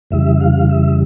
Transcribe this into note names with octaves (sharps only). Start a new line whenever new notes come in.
F2 C#3 E3 G3 E5
F5
E5